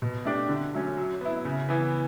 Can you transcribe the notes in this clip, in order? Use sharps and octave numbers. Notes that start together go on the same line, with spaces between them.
B2
A3 D4 G4
D3
F#3 A3 C#4
F#3
B3 E4
C#3
E3 B3